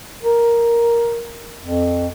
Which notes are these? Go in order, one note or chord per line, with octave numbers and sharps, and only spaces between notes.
A#4
F2